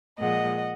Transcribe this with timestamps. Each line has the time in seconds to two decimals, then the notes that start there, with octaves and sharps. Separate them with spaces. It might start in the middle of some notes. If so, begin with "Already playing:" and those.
0.20 A#2 F3 G#3 D#5 F#5